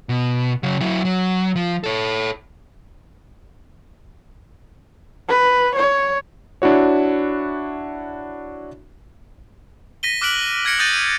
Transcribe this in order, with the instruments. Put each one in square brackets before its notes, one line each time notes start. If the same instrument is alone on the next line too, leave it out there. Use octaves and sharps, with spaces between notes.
[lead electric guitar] B2
C#3 F#3
F#3 E4
F#3
F3
A4 C#5
[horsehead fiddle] B4
C#5
[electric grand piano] D4 E4 F#4 C#5
[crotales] A#6 B6 D#7 G7
D6 F6 F#6 B6 D7 F#7
F6 G#6 A#6 C#7 D7
D#6 G6 A6 A#6 D#7
D#7